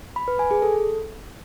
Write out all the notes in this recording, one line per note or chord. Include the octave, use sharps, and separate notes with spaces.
B5
B4
G#5
G#4
A4